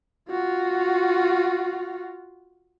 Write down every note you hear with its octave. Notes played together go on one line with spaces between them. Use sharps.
F4 F#4